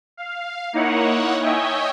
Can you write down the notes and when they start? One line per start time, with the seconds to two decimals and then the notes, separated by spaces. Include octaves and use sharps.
0.17 F5
0.73 A#3 D#4 E4 C#5 F#5
1.42 C#5 D#5 E5 G5 G#5